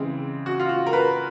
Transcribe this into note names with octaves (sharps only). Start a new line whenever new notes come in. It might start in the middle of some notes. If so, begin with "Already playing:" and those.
Already playing: C#3 E3 G#3 C4
F#4
F4
F#4
A#4
B4